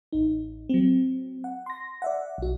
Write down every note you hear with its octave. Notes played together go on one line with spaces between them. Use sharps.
A1 D#4
F#3 C4
F#5
C6 A#6
D5 E5 F#5
B1 F#4